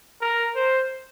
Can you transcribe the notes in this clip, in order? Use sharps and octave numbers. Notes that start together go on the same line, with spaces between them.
A#4
C5